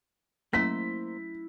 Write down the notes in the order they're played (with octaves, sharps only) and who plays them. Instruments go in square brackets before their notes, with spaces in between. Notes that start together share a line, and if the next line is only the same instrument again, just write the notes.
[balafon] F#3 A3 C#4 [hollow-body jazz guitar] A#3 C5 [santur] E4 [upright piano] B6